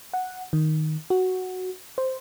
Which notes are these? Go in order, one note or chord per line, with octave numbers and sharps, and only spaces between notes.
F#5
D#3
F#4
C5